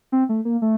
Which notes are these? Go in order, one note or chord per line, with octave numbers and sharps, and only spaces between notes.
C4
A3
A#3
A3